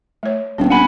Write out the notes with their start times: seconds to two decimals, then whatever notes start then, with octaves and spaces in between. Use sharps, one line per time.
0.23 A3 C#5
0.58 D#1 B3 D4
0.70 D#1 F#5 G#5 B5